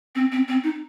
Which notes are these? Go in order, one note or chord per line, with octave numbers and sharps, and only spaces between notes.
C4
C4
C4
D#4